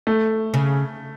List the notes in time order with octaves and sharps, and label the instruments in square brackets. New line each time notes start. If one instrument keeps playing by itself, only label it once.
[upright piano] A3
[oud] C#3